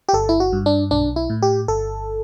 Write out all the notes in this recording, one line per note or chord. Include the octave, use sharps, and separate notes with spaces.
G4
G1 A4
E4
F#4
G2
D4
B1 D4
E4
A2
G4
G1 A4